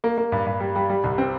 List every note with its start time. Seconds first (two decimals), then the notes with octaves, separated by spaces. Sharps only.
0.04 A#3
0.18 A#3
0.32 G2
0.46 G2
0.60 G3
0.75 G3
0.89 G3
1.04 C2
1.18 C4